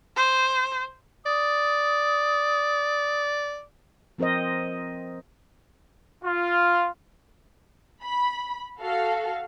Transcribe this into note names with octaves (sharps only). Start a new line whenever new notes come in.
C5
D5 D#6
F3 C4 A#4 C5 D#5
F4
B5
F#4 A4 F5